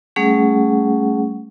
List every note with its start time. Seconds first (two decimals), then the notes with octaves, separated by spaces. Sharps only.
0.16 G3 A3 C#4 G#4 F#5